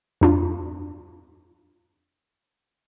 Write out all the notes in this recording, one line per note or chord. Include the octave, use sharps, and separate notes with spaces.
F2 D4 F4